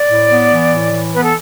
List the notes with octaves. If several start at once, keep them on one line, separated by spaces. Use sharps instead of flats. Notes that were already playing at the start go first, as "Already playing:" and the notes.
Already playing: D5
A2
B3
E3
A2
E3
B3 B4
A4